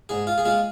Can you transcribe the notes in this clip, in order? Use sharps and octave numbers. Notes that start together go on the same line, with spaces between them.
G#2 G#4
F4
G#4
G#3 F4